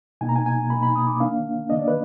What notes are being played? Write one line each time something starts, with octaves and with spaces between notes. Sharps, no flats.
B2 A#3 D#4 G#5
A#5
G#5
G#5
B2 A#3 D#4 B5
B5
D#6
D6
D#3 A#3 D4 F5
D#3 A#3 D4 D#5
D5
B4